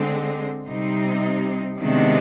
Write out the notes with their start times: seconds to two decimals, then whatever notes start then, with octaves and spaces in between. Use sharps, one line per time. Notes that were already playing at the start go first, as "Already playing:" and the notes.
Already playing: D3 G#3 C4
0.65 C3 G3 C4 D#4
1.80 C3 D#3 G#3 B3 D4